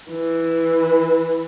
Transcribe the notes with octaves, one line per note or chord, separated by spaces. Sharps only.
E3